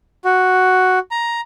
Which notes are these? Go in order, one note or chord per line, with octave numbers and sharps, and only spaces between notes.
F#4
A#5